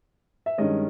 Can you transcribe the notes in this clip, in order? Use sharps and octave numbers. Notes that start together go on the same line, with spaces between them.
E5
G2 D#3 G#3 C#4 D#5